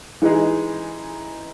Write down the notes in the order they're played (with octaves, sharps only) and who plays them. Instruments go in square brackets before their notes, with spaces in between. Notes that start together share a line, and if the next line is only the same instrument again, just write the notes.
[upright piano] E3 G#3 D#4 G#4